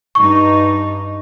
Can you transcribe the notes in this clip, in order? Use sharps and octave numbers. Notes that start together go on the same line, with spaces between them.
G2 D#4 C#6